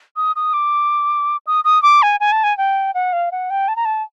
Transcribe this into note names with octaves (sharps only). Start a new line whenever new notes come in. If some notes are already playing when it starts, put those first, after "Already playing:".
D#6
D#6
D6
D#6
D#6
D6
G#5
G#5
A5
G#5
G5
F#5
F5
F#5
G5
A5
A#5
A5